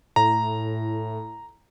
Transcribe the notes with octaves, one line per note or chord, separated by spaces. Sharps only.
A2 A#5